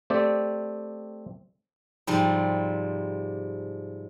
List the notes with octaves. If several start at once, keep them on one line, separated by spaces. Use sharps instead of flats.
A3 C4 G4 D5
G#2 C3 F3 G3